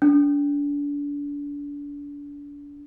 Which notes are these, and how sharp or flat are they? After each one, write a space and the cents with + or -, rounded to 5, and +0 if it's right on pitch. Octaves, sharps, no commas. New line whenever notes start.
D4 -30